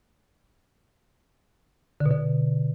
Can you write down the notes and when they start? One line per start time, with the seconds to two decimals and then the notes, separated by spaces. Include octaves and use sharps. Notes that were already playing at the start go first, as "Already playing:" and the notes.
2.00 D3
2.06 B2
2.11 D3